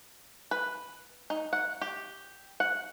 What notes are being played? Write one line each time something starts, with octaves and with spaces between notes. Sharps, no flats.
B4
D#4
F#5
G4
F#5